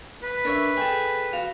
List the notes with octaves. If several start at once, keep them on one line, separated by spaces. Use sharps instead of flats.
B4
D4 A#4 C#5 E5
G#4 A4 G5
F#4 F5